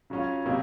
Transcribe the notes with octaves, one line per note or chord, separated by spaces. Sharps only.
C#3 F#3 C#4 F4
C3 F#3 A#3 D#4